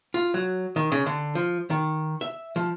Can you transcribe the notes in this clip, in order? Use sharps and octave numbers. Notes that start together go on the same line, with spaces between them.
F4
F#3
D#3
C#3
D3
F3
D#3
E5
F3